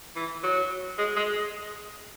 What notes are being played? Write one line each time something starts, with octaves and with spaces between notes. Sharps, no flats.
E3
F#3
G#3
G#3